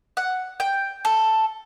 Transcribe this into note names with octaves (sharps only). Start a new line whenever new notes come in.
F#5
G5
A4